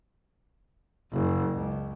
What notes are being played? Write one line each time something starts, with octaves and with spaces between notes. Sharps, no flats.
F#1
C#2